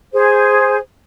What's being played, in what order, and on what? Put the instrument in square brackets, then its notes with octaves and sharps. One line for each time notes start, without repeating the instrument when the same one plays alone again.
[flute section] G#4 C5